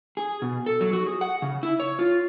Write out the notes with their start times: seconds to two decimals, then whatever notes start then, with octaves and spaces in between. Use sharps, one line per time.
0.17 G#4
0.42 B2
0.66 A4
0.81 F#3
0.93 F#4
1.06 G#4
1.21 F#5
1.42 C#3
1.63 E4
1.80 C#5
1.99 F4